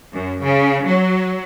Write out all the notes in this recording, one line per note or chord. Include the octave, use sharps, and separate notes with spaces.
F#2
C#3
F#3